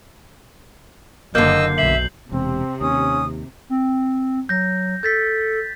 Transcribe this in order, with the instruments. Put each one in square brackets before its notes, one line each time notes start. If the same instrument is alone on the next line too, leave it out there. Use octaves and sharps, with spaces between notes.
[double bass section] F#1 [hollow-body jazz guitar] D3 A#3 [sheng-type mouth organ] D#5 E6 [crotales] G6 C7
[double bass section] B1 [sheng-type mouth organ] E5 [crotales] C7 F#7
[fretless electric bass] E1 [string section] C3 [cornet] C4
[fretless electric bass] D#2 [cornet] C#4 [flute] D#6
[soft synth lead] C4
[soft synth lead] F#3 [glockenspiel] G6 A#6
[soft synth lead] A4 [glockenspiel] G6 A6 B6